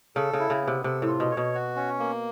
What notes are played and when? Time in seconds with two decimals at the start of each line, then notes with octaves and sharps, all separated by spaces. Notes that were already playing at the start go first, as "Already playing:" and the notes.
0.16 C#3 A4
0.33 C#3
0.39 E4
0.50 C#3
0.61 B3
0.68 C3
0.84 C3 A4
1.02 A2
1.08 F4
1.20 B2
1.31 C#5
1.37 B2
1.54 F#4
1.76 C#4
1.99 A#3